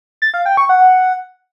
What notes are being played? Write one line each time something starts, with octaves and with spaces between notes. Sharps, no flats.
A6
F5
G5
C#6
F#5